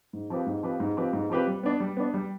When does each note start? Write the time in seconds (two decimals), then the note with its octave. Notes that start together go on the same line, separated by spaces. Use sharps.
0.13 G#2
0.30 F3 C4 G4 B4
0.47 G#2
0.63 F3 C4 G4 B4
0.80 G#2
0.97 F3 C4 G4 B4
1.13 G#2
1.30 F3 C4 G4 B4
1.47 G3
1.63 B3 D4
1.80 G3
1.97 B3 D4
2.14 G3